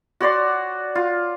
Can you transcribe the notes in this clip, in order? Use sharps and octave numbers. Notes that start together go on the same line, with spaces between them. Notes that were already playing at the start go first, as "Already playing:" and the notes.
F#4 C#5 D5 C6
F4